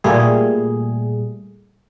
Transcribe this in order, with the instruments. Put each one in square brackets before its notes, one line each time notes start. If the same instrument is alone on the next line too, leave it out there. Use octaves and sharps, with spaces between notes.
[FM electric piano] A#2 G3 A3 G#4